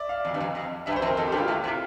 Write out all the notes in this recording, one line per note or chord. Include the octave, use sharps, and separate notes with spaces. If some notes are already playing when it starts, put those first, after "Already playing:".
Already playing: D5 E5
F5
F2
G2
F2
F2
G2 E5
C5
F2
A#4
F2 A4
G4
G2
F4
A2 E4
C3 F4